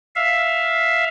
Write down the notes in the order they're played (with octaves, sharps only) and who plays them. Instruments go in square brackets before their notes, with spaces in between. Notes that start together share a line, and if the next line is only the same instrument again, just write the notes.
[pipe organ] E5 F5